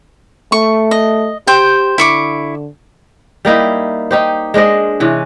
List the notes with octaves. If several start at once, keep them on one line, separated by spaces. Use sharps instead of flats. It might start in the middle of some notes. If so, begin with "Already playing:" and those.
A3 C#6
D#5
G4 C5 G5
D3 E4 C#6 D6
G3 A#3 D#4 E4
D#4 G4 C5
G#3 D4 C5 D#5
C3 E3 C#4